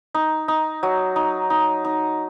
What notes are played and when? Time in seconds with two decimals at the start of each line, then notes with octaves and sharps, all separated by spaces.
0.14 D#4
0.48 D#4
0.83 F#3
1.16 D#4
1.50 D#4
1.85 D#4